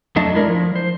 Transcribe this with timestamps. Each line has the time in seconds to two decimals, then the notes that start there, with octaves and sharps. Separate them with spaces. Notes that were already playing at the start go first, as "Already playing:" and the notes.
0.16 F2 F#3 A3 D4 D#5 A5
0.34 G#3 E4 A#4 D5
0.48 F3
0.75 C5